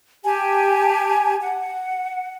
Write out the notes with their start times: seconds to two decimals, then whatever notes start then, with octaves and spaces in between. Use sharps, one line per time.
0.24 G4 G#5 A5
1.41 F#5